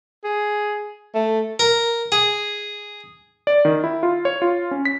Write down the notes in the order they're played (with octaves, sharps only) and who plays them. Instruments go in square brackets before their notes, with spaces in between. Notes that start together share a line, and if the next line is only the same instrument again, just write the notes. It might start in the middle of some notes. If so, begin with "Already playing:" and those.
[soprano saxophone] G#4
A3
[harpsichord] A#4
G#4
[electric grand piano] D5
D#3
E4
F4
C#5
F4
C#4
B6